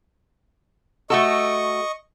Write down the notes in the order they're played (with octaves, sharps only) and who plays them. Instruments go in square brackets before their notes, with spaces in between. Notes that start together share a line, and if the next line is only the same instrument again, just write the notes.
[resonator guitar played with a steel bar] A3 F#4 A4 [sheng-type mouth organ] D#5 C#6